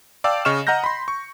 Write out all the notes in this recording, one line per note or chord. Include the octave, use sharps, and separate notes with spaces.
D5 F5 G5 A5 D6 E6
C#3 D#5 C#6 F6 E7
D#5 F#5 A#5 F6 G6 A#6
B5 C6
C#6